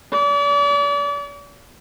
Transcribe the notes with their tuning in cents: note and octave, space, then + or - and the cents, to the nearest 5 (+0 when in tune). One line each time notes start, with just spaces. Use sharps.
D5 -40